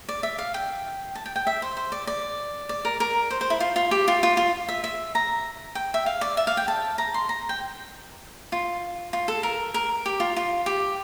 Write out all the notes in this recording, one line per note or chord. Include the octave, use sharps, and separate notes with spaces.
D5
E5
F5
G5
A5
G5
G5
E5
C5
C5
D5
D5
D5
A#4
A#4
C5
C5
E4
F4
F4
G4
F4
F4
F4
E5
E5
A#5
G5
E5
F5
D5
E5
F5
G5
A5
A#5
C6
A#5
G5
F4
F4
A4
A#4
A#4
G4
F4
F4
G4